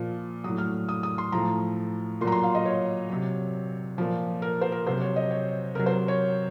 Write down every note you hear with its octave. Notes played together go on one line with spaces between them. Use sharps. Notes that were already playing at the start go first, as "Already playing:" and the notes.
Already playing: A#2 F3
A2 F#3 D#6
F6
D#6
D#6
C6
A2 F3 A#5
A#2 F#3 A#5 C6
C6
F5
D#5
C#5
C3 F#3
A#2 F3
A#4
C5
A#4
C3 F#3 C5
C#5
D#5
C#5
C3 F#3 A#4
C5
C#5